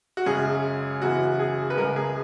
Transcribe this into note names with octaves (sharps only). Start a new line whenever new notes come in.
F#4
F#2 C#3 G#3 C#4 G#4
F#2 C#3 E3 F#4
G#4
B4
C#2 C#3 G#3 A#4
G#4